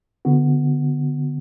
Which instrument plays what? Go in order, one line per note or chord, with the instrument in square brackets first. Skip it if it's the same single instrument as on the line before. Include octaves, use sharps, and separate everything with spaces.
[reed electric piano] D3 B3 F#4